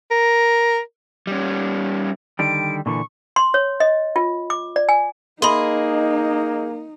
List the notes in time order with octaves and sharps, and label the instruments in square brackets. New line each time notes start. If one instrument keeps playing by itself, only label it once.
[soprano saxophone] A#4
[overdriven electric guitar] G3 C#4
[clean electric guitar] D3 D#3 G3 [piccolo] D7
[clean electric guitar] A#2 D3 E3 [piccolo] C#6
[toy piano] C6
C#5
D#5
F4
D6
D5
G#5
[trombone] A#3 [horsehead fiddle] D#4 [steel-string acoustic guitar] G#4 D#5 [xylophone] B5 C6